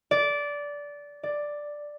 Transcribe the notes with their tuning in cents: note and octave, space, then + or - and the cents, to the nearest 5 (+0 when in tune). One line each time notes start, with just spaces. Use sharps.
D5 -15
D5 +5